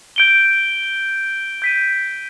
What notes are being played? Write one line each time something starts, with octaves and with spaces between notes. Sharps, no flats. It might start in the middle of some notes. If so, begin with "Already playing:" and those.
G6 D7 G7
G6 B6 D#7